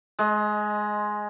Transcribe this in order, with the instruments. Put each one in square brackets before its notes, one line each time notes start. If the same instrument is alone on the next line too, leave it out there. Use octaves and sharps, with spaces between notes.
[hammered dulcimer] G#3 D#5